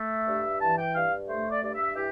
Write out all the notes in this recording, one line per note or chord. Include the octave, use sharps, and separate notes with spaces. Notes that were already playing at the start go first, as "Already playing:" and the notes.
Already playing: A3 E5
G2
E3 A5
G5
G2 F5
A3 C5
D5
G2 D5
E5
E3 G4